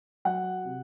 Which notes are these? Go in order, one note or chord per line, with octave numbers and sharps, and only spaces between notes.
F#3 F#5
C3